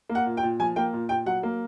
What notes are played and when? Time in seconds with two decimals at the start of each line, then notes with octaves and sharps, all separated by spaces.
0.09 A#3
0.15 F#5
0.26 A#2
0.37 G5
0.43 A#2
0.60 F3 G#5
0.76 A#3 G5
0.93 A#2
1.09 A#2 G5
1.26 F#3 F#5
1.43 A#3